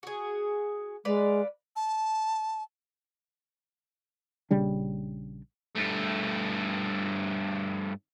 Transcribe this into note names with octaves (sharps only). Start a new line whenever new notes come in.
F#4 G#4
G#3 B4 D5 F5
A5
A#1 C#3 G3 D4
G2 A3